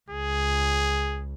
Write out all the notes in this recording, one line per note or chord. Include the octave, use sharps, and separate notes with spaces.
C#2 G#4